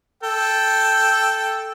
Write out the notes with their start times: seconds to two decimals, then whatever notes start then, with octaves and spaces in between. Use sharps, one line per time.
0.23 A4 G5